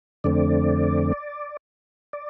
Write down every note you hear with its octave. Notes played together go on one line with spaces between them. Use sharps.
F2 D3 A3 C4 D5
D5